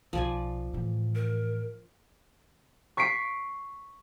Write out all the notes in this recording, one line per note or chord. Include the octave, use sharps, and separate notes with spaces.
B1 F3 D5 G#5
A2 E3
A#4
C#6 B6 C7 D7